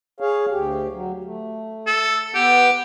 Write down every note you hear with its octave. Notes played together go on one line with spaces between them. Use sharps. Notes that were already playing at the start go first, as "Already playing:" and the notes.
G#4 C#5 F5
D2 G4
F#3
A3
A4
B3 G4 F#5